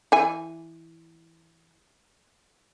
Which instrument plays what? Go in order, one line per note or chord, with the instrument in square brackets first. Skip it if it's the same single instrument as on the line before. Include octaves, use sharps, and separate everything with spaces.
[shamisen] E3 G#5